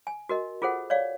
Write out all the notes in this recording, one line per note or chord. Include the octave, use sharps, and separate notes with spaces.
G#5
F#4 A#4 D#5
F4 G#4 A4 C5 F#5
C#5 D5 F5